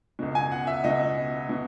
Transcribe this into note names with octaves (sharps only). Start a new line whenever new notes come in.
C#2 B2
G#5
F#5
E5
C#2 B2 D#5
B2